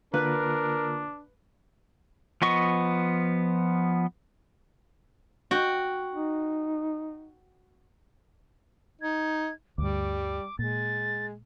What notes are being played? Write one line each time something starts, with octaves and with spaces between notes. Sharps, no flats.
D3 A#3 D4 F4 A#4 B4
F3 B3 D#5 C#6
F#4 G5
D#4
D#4 G#6
D2 G2 G3 D6
A#2 G#3 A6